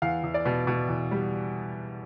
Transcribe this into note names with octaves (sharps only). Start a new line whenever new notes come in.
E2 F5
E2
D5
B2
B2
E2
G3